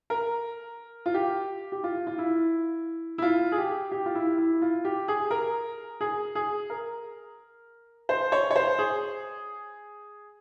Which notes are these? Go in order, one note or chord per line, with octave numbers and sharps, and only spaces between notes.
A#4
F4
G4
G4
F4
F4
E4
E4
F4
G#4
G4
G4
F4
E4
E4
F4
G4
G#4
A#4
G#4
G#4
A#4
C5
C#5
C#5
C5
G#4